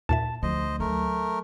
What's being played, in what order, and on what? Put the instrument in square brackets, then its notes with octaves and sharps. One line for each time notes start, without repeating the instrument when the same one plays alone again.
[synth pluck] D#2 A#2 E5 [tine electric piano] A5
[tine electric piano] D2 [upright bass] F3 [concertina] C5 D#5
[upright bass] F#3 [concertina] A3 A#4